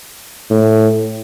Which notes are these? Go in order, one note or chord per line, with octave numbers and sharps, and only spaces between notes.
A2